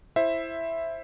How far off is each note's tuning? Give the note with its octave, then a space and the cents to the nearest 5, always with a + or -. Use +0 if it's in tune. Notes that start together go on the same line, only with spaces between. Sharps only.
E4 +10 C5 +15 E5 +0